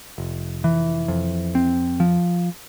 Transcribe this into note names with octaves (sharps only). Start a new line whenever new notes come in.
F1
E3
F2
C4
F3